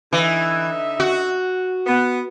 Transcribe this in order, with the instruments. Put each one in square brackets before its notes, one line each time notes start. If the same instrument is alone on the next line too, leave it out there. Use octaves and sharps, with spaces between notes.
[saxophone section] D3 D#4 E5 [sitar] E3
[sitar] F#4
[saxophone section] B3